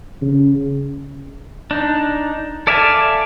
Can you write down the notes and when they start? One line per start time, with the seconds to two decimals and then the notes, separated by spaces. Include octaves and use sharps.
0.22 C#3
1.71 D4 D#4
2.67 A4 D5 E5 F5 G#5